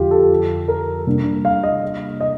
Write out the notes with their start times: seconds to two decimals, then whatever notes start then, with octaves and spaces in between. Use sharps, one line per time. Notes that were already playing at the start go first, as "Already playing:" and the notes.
Already playing: F2 D3 F3 F4 G4
0.11 A4
0.68 A#4
1.07 C3 G3 A#3 D4
1.45 F5
1.63 D#5
2.20 D#5